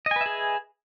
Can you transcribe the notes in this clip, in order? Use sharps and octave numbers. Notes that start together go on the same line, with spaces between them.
G#4 B4 D#5 E5 G#5